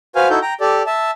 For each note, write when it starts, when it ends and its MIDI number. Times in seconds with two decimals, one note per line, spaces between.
0.16 0.28 66
0.16 0.28 71
0.16 0.28 72
0.16 0.28 77
0.16 0.28 80
0.16 0.28 89
0.30 0.39 63
0.30 0.39 64
0.30 0.39 66
0.30 0.39 69
0.30 0.39 91
0.42 0.54 79
0.42 0.54 82
0.61 0.83 67
0.61 0.83 69
0.61 0.83 74
0.87 1.11 76
0.87 1.11 81